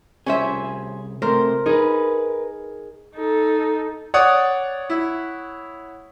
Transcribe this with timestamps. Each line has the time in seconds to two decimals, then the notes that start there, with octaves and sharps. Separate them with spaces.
0.26 C2 C#4 G#4 C5 E5
1.22 C3 A3 A#4 C5
1.66 D#4 G#4 A#4 B4
3.15 D#4 A4
4.14 C#5 D5 F#5 D#6
4.90 E4